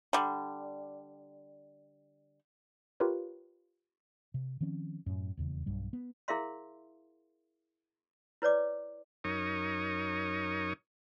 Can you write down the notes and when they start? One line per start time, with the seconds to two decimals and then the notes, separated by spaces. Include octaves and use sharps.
0.13 D3 G3
3.00 F4 G4 A#4 B4 C#5
4.34 C3
4.61 D#3 F3 C4 C#4
5.06 F#2 A2
5.37 D#1 E2 C#3
5.66 B1 G2 G3
5.93 B3
6.28 E4 G#4 A#4 E5 F5 C6
8.42 E4 B4 C#5 D5 D6
9.24 F#2 D#4 A#4 C#5 C#6 D#6